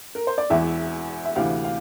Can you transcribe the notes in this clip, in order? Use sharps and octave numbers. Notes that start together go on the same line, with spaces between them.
A#4
C5
D5
E1 E2 E3 E5
E5
D2 C3 E3 F5
F5